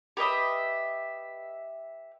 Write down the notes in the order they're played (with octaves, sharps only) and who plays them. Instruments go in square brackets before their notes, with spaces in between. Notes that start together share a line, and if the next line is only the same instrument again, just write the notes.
[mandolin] G4 B4 D#5 E5